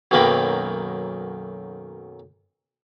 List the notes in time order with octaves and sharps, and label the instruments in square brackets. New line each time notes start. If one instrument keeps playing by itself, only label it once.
[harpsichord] B1 F#2 D#3 A#3 B4 G5